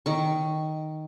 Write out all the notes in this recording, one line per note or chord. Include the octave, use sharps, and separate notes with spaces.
D#3 C#6